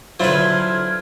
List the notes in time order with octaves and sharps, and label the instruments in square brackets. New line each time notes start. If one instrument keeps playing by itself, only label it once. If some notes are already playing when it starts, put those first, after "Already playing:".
[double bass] D3 [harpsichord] F#3 B4 [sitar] E4 F4 C5 [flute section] F6 G#6